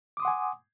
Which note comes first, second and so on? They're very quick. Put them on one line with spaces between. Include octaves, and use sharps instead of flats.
D6 D#6 C6 F#5 G#5